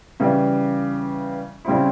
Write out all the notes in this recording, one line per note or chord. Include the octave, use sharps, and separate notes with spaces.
C#3 E3 G3
C#3 G3 C4 E4